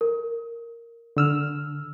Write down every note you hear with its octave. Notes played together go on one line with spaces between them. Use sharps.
A#4
D3 E6 F6